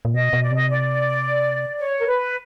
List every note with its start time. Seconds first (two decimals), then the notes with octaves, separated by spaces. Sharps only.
0.05 A#2
0.14 B2 D#5
0.33 B2
0.42 D5
0.51 C3 D#5
0.69 D5
1.78 C#5
1.98 A#4
2.05 B4